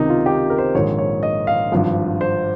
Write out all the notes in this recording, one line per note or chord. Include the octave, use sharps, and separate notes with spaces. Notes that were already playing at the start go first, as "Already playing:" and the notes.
Already playing: C#2 C3 D#3 D#4
F4
G4
A#4
C5
A#1 G#2 D#3 C#5
C#5
D#5
F5
G#1 G2 F3
C5